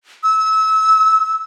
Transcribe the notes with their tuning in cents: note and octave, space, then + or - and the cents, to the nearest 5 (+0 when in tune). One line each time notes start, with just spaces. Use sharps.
E6 -25